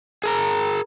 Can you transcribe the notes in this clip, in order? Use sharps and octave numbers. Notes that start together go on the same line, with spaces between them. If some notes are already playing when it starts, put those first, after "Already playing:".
G#4 A#4 A#5